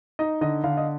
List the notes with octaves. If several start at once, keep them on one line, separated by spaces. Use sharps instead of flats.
D#4 D#5
D3 D#5
D3 F5
D#5